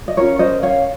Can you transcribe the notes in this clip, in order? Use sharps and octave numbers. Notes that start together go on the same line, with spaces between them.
D#5
C#4 F4 A#4 C#5
C5 D#5
C#5 F5